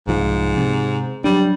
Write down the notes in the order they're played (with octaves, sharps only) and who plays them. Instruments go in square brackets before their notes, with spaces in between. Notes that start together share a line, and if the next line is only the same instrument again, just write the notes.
[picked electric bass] C2 F3 [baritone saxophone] G#2
[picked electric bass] C3
[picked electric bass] F#3 D4 [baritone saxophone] G3